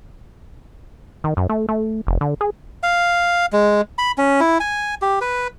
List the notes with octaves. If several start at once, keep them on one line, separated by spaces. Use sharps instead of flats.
D#3
F#2
A3
A3
F1
D3
G#4
F5
G#3
B5
C#4
E4
G#5
G4
B4